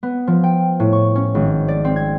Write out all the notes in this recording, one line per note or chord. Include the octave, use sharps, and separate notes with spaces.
B3
F3
G5
A2
C#6
C#4
G#1
D5
C4
G#6